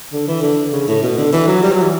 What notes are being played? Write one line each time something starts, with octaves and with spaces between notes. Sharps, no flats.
D3
E3
D3
C#3
A2
B2
D3
E3
F#3
G3
F#3
E3